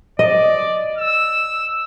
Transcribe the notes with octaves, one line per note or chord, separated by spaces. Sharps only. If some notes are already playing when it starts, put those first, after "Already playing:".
D5 D#5
E6